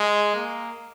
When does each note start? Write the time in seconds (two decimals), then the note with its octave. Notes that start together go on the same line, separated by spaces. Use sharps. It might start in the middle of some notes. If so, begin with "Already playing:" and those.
Already playing: G#3
0.36 A#3